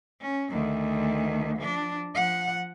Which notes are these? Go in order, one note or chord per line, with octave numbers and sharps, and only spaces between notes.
C#4
D2 D#3
F3 D4
F3 F#5